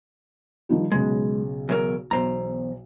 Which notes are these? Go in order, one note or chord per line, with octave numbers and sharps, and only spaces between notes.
D#3 F3 G3
B1 C#3 G#3 B3
E2 F#3 A#4
B1 E2 C5 A#5